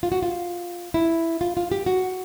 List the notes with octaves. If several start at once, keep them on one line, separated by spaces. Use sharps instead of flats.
F4
F#4
F4
E4
F4
F4
G4
F#4